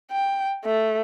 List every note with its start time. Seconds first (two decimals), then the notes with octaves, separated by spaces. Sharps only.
0.11 G5
0.65 A3